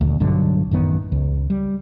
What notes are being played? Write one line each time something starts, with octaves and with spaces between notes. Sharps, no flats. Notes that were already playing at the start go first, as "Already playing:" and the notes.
D#1 D2
B1 G2 D3 F#3
A1 F#2 D#3 B3
C#2
G3